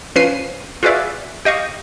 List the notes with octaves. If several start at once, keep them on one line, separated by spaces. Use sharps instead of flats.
F3 C#4 B4 C7 D#7
F4 F#4 G#4 B4 D5 E5
G4 D#5 F5 C#6